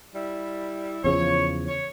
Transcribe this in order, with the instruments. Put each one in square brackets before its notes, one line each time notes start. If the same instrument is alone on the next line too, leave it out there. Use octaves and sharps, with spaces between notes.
[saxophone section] G3 E4
[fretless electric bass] E2 C#3 F3 [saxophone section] C#5
[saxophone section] C#5